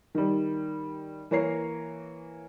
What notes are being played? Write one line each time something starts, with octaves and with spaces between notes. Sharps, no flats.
D#3 G3
E3 A#3 C#5 A#5 C7